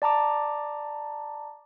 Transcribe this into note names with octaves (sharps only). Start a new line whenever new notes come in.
D5 A5 A#5 D6